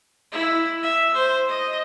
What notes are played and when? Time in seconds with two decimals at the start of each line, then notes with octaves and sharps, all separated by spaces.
0.32 E4
0.83 E5
1.14 C5
1.48 D#5